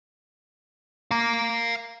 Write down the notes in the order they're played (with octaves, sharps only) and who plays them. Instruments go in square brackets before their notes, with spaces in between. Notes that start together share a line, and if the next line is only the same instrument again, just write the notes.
[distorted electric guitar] F5 A#5